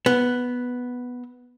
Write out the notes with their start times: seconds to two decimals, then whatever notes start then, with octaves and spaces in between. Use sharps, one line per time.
0.06 B3